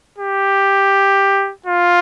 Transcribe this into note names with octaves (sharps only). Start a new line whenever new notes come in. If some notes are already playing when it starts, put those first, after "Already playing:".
G4
F4